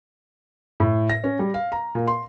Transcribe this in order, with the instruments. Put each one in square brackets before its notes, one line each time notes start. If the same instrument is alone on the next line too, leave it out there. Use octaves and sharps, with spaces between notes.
[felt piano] A2
A#6
C#4
G3
F5
A#5
A#2
C6